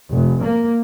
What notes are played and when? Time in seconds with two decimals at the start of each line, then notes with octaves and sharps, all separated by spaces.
0.11 F1
0.41 A#3